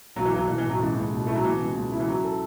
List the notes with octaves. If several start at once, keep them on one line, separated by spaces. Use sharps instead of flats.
B1 F#3
E3
B1 F#3
B1 E3
E3
A2
F#3
C#2 E3
C#2
B2
A3 E4
F#3
B2 E3
C#2
C#2
E4
E3
F#3 C#4
A4